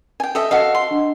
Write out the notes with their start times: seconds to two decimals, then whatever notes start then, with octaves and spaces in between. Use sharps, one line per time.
0.20 G5 G#5
0.35 A4 D#5 E5
0.51 F#4 A4 D#5 F5
0.75 C6
0.91 D4